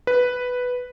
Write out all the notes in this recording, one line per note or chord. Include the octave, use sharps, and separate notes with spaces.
B4